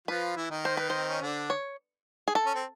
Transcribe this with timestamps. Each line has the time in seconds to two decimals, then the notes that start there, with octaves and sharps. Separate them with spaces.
0.08 F3 F4 B4
0.36 E3 E4
0.51 D#3 D#4
0.65 C5
0.77 B4
0.90 C5
0.96 C4
1.09 C#4
1.21 D3 D4
1.50 C#5
2.28 G#4
2.35 A4
2.46 C#4
2.55 C4